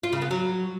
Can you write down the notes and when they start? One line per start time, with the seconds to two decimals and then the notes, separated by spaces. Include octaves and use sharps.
0.03 F4
0.12 C#3
0.22 B3
0.31 F#3